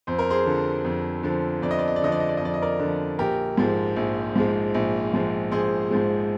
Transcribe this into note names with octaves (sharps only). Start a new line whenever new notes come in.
F2 C5
A#4
G#4 C5
D3 F3
F2
D3 F3
F2 D5
D#5
D5
D#5
D5
D3 F3 D#5
D5
D#5
D5
D#5
F2 D5
D#5
A#4 D5
D3 F3
A#1 G4 A#4
G#2 F3 G#3
A#1
G#2 F3 G#3
A#1
G#2 F3 G#3
A#1 G#4 C5
G#2 F3 G#3